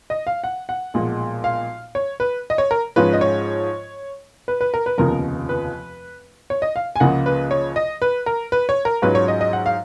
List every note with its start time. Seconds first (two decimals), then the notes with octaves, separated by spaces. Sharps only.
0.10 D#5
0.27 F5
0.44 F#5
0.69 F#5
0.94 B1 A#2 F3 G#3
1.44 F5
1.95 C#5
2.20 B4
2.50 D#5
2.58 C#5
2.71 A#4
2.96 G#2 F3 G#3 C#4 F4 B4
3.13 D#5
3.21 C#5
4.48 B4
4.61 B4
4.74 A#4
4.86 B4
4.98 F1 D#2 C#3 F3 B3 A#4
5.49 B4
6.50 C#5
6.62 D#5
6.76 F5
6.96 G#5
7.00 C#2 C#3 F3 A#3 F4 F#5
7.26 B4
7.51 C#5
7.76 D#5
8.02 B4
8.26 A#4
8.52 B4
8.69 C#5
8.85 A#4
9.02 G#2 F#3 C#4 F4 B4
9.15 C#5
9.28 D#5
9.41 D#5
9.53 F#5
9.66 F5